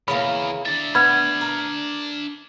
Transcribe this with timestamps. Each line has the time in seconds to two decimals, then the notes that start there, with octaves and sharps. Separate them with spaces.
0.08 E2 C#3 E3 A#3 B5
0.65 D4 E5 A6
0.95 B3 B4 B5 G#6
1.41 A#4